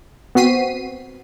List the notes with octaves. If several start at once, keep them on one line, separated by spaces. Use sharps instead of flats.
B3 C4 F#4 B6 C7 D#7